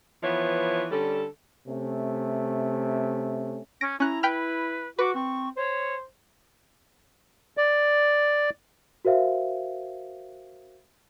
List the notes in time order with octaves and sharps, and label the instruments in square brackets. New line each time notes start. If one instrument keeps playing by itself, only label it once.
[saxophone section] E3 F3 B3 B4 C#5 E5
D3 G3 C#4 A4
[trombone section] C3 A3 C#4
[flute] C#4 [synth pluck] A#6 D7
[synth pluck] C#4 F#6 [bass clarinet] E4 [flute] A#5
[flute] B4 [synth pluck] G5 B5 F6
[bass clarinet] F#4 [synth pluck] B4 [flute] D6
[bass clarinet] C4 [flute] C#6
[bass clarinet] C5 [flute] C#5
[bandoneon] D5
[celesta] F#4 A#4 C5 E5 F5